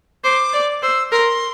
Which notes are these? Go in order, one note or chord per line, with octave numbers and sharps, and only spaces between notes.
C5 D6
D5
C5 E6
A#4 C6